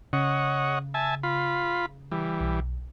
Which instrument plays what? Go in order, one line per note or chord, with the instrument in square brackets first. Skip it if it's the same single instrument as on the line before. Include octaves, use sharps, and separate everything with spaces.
[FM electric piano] C#3 [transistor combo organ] C#5 D#5 F#5
[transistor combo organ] E5 G#5 A5
F4 B5
E3 G3
[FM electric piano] B1